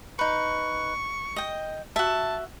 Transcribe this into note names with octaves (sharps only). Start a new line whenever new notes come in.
D#4 B4 C#6
D#5 G5
F#4 E5 A5